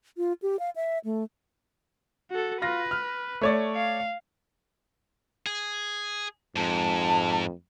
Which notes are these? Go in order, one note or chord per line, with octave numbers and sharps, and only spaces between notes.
F4
G4
F5
E5
A3
F#4 A4
F4 B4 A#6
F6
A3 C#5 D5
F5
G#4
F2 G#2 A5